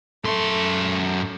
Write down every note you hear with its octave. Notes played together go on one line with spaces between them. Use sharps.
F#2 A3 C6